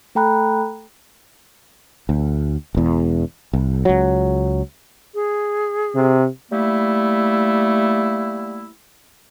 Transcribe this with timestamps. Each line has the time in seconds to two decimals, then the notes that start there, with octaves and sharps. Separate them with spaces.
0.15 A3 A4 G5 A#5 B5 F#6
2.09 D2
2.75 E1 E2
3.53 C2
3.85 C#2 F#3
5.14 G#4
5.95 C3
6.51 G3 A3 A#3 E4